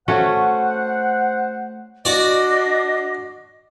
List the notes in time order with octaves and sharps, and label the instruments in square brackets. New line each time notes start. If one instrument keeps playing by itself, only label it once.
[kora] A3 C#4 F#4 [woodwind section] C5 F#5
[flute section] D4 D#5 [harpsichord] F#4 D5